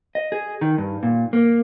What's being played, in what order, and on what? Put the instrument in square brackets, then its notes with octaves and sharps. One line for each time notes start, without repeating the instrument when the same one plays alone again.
[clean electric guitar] D#5
G#4
D#3
G2
A#2
A#3